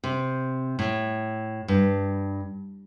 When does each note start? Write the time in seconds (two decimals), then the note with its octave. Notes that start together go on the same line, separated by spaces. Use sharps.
0.04 C3
0.79 A2
1.68 G2